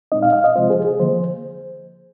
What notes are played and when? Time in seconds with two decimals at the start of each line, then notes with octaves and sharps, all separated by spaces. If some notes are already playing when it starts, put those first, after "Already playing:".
0.12 A#2 G#3 C4 D#4 D#5
0.22 F5
0.33 F5
0.44 D#5
0.55 C3 F3 G#3 C4 F4 C5
0.70 G#4
0.85 G#4
0.99 D3 F3 A#3 C5